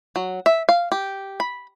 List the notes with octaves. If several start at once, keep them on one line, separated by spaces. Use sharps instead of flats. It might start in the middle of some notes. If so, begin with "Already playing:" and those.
F#3
E5
F5
G4
B5